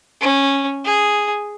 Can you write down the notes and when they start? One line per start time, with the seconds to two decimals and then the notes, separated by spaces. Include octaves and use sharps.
0.21 C#4
0.85 G#4